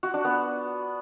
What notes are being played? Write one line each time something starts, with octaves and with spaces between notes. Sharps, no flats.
F#4
D4
B3